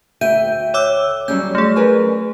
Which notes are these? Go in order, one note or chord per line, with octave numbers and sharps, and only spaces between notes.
D2 E5 G5 G6 D#7
C#5 D6 E6
F#3 G3 C#4 G6
A3 G#4
A#4 B4 G#5